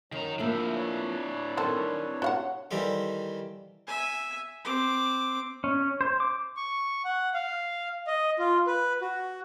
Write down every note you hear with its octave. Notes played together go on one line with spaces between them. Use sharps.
F#2 D#3 F#3 A#5
F3 A#3 D4 E4 E5 F5 G5
B4 C#5 D5
D#3 G3 C4 A4
C3 F#4 C#5 F5 F#5
D#3 E3 G3 A4 C5 F5
E5 G#5
C4 D6
C#4
C5
D6
C#6
F#5
F5
D#5
F4
B4
F#4